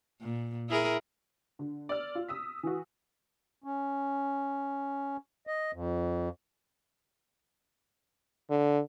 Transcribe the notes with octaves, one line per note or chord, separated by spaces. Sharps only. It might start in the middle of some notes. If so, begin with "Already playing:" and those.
A#2
E4 G#4 A#4
D3
D5 E6 F6
F4
D#6 E6 B6
E3 F#4
C#4
D#5
F2
D3